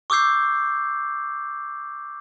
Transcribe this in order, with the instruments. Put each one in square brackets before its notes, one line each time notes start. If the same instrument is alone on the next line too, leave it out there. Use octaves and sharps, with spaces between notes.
[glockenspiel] C#6 D6 E6 G6 C7